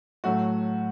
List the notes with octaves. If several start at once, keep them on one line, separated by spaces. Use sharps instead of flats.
A2 F#3 A3 F#4 A4